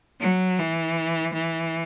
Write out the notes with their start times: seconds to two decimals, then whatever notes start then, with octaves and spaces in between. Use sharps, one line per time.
0.20 F#3
0.59 E3
1.33 E3